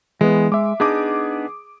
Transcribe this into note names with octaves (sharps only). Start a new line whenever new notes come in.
E3 G#3 B3
G#3 E5 D6
B3 D4 D#4 G#4 D6 D#6